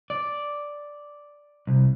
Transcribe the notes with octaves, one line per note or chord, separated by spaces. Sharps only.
D5
C2